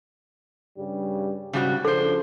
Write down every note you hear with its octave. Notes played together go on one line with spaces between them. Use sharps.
G2 C#3 G3
G#2 C#3 G3 F#4
C#3 F3 D4 A4 C5